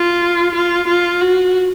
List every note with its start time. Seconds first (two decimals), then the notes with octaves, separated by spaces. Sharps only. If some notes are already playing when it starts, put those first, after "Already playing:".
Already playing: F4
0.55 F4
0.87 F4
1.21 F#4